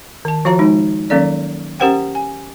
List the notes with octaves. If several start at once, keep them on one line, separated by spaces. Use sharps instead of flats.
D#3 A5
F3 F4 F#4 C#5 F5 A#5
G#3 D#4
D#3 F#3 A#3 C#4 A4 D5
C#4 G4 A#4 C5 F#5 G5
G#5